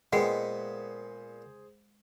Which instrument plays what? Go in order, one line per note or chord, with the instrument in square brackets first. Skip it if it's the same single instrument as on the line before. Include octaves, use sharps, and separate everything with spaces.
[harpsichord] A#2 B3 [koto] G#3 [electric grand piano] G#4 C5 [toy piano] F#5 G5